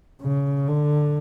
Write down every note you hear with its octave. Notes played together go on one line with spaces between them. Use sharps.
C#3
D3